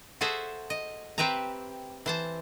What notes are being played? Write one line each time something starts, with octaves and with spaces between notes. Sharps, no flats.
F#4 G#4 A4 C5 E5
D#5
C4 G4 B4 E5 A#5
E3 C5 A5